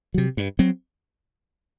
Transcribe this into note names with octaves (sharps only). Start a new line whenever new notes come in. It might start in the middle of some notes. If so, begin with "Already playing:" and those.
C3 F#3
G2
F#3 C4